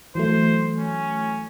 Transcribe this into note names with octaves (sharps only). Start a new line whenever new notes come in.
E3 F#3 A3 C5
C#4